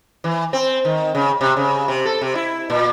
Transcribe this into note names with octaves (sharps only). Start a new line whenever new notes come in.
E3
C4
D#3
C#3
C3
C#3
C3
A4
C3
E4
A#2